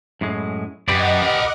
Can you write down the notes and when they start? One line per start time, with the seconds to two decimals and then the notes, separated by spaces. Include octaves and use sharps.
0.21 F#2 A2 G#3
0.88 F#2 G4 B4 D5 D#5 F#5 D6
1.22 A#4 B5